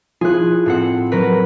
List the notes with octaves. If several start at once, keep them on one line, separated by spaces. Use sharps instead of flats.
F3 E4 G#4 F#6
A2 C4 F#5
F#3 A#4 B4